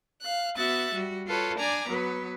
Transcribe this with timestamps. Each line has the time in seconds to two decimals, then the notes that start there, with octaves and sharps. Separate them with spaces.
0.22 F5 F#6
0.56 B3 F#4 E5 F#6 A6
0.95 G3 F#4
1.27 F4 A4 B4 C#5
1.59 D4 D5 G#5 A#5 D6
1.89 F#3 B3 B4